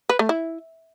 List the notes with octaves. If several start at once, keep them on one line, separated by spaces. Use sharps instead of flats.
B4
A3
E4